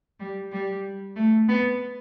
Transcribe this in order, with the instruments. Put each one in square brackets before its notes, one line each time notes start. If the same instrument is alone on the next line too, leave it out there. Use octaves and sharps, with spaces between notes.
[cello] G3
G3
A3
B3